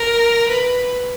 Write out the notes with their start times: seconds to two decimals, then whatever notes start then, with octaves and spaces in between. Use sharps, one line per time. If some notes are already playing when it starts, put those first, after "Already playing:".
Already playing: A#4
0.48 B4